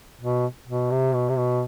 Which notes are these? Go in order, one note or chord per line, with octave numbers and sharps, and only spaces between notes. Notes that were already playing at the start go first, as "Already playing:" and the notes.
B2
B2
C3
B2
C3
B2